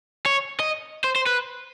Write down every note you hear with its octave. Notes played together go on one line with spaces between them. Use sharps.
C#5
D#5
C5
C5
B4